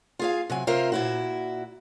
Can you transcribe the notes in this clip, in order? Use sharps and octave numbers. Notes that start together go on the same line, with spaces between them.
F4 G#4 F5
C3 F#3 G#5
C3 F4 A#4 C5 E5
A#2 E4 F#4